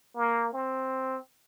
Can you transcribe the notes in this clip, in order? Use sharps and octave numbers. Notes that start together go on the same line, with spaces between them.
A#3
C4